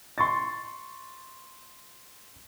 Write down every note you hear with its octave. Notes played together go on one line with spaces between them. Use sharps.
C6 C#6 A6